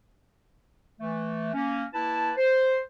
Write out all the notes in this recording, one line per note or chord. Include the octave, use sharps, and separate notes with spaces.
E3 A3
A#3 C#4
A#3 E4 B4 A5
C5